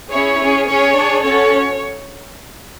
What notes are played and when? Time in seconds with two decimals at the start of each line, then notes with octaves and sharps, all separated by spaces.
0.10 C#4 E4 G#4 C#5
0.38 C#4 G#4
0.67 C#4 G#4 C#5
0.94 D4 G#4
1.23 C#4 F#4 A4 C#5